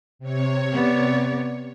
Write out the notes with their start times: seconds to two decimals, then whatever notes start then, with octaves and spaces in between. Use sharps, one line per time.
0.19 C3 C#5
0.73 B3 D5